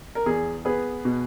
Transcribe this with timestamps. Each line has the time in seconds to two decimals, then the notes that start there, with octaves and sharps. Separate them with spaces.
0.15 A#4
0.26 E2 G#4
0.65 B3 G#4 B4
1.05 B2